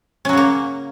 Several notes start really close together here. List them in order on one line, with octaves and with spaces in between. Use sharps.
C#4 F#3 C#3 A#3